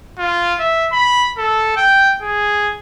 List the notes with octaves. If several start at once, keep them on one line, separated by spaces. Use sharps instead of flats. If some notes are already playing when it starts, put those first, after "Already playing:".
F4
E5
B5
A4
G5
G#4